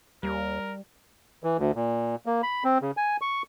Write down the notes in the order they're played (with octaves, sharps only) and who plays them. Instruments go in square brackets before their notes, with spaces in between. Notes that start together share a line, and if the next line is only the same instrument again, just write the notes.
[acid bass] D#2 [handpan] G3 [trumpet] A#4
[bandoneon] E3
D2
A#2
A#3
B5
C4
C#3
G#5
C#6